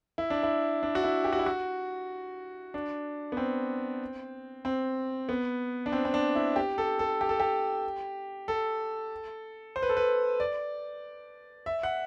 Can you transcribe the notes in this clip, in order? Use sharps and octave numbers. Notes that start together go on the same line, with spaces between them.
E4
D4
E4
D4
F#4
E4
G4
F#4
E4
F#4
D4
B3
C4
C4
B3
D4
C4
C4
D4
E4
G4
A4
A4
G4
A4
G4
A4
C5
B4
A4
B4
D5
E5
F#5